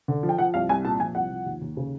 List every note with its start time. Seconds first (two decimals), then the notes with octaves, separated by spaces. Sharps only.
0.08 D3
0.23 F3
0.29 G5
0.38 F3 F#5
0.54 C2 F5
0.69 C2 G#5
0.85 A#2 A5
1.00 F3 G#5
1.15 C2 F#5
1.31 F3
1.46 D#2
1.61 D#2
1.77 C#3